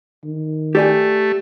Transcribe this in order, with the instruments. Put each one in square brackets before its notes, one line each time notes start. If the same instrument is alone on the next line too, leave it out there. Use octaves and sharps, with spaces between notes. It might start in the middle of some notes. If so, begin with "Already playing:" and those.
[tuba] D#3
[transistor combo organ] A3 [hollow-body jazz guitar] G4 D5 G#5